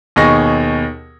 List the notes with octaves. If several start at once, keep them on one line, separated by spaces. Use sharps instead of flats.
D#2 B2 D#4 G#4 C#6 A#6